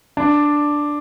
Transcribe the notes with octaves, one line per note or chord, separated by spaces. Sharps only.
D4